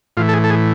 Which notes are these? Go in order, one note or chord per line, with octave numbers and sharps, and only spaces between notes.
A2 E3 F4
A4
G#4
A4
G#4